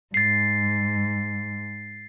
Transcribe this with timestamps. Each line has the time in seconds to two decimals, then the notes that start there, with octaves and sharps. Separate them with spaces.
0.14 G#2 A6 C7